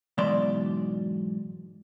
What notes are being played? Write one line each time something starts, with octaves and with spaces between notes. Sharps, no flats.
G#2 B2 E3 F#3 D5 C6